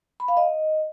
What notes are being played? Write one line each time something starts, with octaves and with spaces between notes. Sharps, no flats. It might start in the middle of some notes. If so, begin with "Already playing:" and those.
B5
F5
D#5